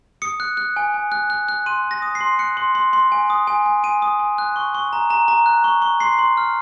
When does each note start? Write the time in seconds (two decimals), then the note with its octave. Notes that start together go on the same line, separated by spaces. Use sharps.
0.22 D#6 C#7
0.40 F#6
0.57 F#6
0.76 G#5
0.94 G#5
1.12 F#6
1.30 F#6
1.49 F#6
1.66 C6 D#7
1.84 F#6
1.91 A#6
2.02 D#6
2.15 C7
2.21 C6
2.39 F#6 C#7
2.57 C6
2.75 C6
2.93 C6
3.12 G#5
3.30 D#6
3.47 G#5
3.66 G#5
3.84 G#5 D#7
4.02 D#6
4.19 G#5
4.38 F#6
4.56 C#6
4.75 C#6
4.93 A#5
5.10 A#5
5.28 A#5
5.46 F#6
5.64 C#6
5.82 C#6
6.00 C6 C7
6.19 C6
6.37 F6